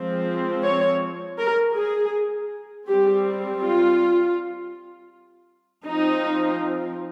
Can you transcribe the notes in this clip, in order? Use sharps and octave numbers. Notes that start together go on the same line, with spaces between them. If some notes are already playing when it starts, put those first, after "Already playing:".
Already playing: F3 G#3 C4
C#5
A#4
G#4
G3 C4 G4
F4
F3 C4 D#4